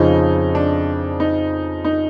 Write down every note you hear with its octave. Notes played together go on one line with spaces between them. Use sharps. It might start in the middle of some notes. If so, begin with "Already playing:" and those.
Already playing: F2 C#3 F3 D#4
D4
D#4
D#4